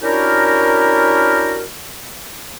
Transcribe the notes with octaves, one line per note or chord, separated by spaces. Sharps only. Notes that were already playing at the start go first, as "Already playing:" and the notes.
C#4 D4 E4 F#4 G4 A#4